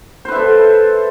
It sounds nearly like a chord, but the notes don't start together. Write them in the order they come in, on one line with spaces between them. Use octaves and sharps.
C5 B4 E5 A4